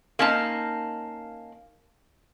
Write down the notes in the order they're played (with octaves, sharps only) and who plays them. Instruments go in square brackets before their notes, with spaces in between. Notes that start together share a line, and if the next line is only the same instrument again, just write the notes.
[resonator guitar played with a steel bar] A#3 C#4 D#4 C5 A5